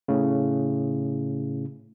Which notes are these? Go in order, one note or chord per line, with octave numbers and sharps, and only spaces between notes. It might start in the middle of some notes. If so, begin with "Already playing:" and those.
A2 C#3